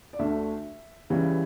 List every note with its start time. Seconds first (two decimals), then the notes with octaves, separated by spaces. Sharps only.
0.13 D5
0.19 D2 D3 A3 E5
1.10 C#2 C#3 E3 G3